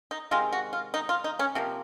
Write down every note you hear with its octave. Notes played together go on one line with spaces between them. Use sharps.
D#4
C3 D#3 G#3 F4
F#4
F4
D#4
F4
D#4
C#4
C3 F3 A#3